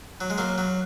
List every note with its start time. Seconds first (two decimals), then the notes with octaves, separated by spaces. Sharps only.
0.21 F#3
0.30 G#3
0.38 F#3 A#3
0.58 F#3